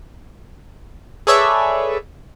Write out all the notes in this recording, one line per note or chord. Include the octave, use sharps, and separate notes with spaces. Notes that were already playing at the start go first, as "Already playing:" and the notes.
G#4 A4 B4 C#5 D5 E5